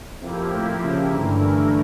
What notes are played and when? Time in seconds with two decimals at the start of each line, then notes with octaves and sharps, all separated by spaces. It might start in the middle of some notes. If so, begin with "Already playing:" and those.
0.22 F2 F3 A#3 E4 G4
0.53 A2
0.84 C#3
1.14 G2 D3 E3 A3 E4 A#4